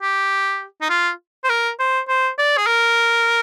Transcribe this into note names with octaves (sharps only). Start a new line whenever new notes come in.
G4
D#4
F4
C5
A#4
C5
C5
D5
G#4
A#4